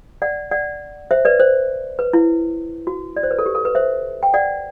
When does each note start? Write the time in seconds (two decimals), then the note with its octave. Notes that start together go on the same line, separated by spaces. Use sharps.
0.22 D5 F#5
0.51 D5 F#5
1.11 C5 E5
1.25 B4 D5
1.40 C5
1.99 B4
2.13 E4
2.87 F#4
3.17 D5
3.23 C5
3.31 B4
3.39 A4
3.46 G4
3.55 A4
3.65 B4
3.75 C5 E5
4.23 G5
4.34 D5 F#5